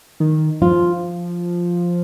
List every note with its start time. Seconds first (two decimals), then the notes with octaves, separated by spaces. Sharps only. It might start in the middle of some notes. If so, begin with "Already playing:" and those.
0.20 D#3
0.61 F3 F4